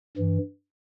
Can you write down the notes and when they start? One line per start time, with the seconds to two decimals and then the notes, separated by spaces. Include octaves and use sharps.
0.17 G2 E3